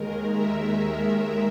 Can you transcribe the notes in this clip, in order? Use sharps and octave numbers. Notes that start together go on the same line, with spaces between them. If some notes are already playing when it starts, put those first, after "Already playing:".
Already playing: D#2 D#3 G#3 A#4
E5